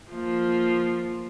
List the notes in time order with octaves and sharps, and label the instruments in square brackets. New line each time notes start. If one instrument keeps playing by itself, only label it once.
[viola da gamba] F3 A#3